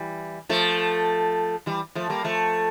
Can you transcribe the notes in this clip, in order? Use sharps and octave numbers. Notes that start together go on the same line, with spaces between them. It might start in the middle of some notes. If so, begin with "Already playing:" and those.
Already playing: E3 G3
F3 A3
E3 G3
F3 A3
G3 A#3
F3 A3